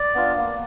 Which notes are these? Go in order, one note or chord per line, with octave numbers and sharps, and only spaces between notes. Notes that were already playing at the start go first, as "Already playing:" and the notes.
Already playing: D5
B3 D4 F4
A#3